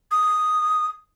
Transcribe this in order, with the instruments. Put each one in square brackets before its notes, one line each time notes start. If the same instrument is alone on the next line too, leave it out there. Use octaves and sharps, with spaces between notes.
[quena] D#6